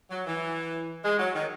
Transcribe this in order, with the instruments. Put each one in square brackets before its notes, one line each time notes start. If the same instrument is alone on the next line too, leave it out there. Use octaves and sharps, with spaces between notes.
[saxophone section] F#3
E3
G#3
F#3
D#3